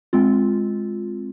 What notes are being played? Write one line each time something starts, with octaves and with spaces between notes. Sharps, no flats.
G#3 C4 F4